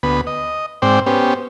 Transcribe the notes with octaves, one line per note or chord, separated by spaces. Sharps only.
D2 B3 B5
D#5
G#2 C4 C5 D5 G5
B3 C#4 G4 C5